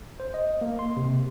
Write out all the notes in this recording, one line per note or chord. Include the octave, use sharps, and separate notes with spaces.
C5
D#5
A#3
C6
C3